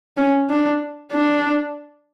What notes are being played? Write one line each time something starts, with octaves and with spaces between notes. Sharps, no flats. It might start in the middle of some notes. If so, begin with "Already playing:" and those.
C#4
D4
D4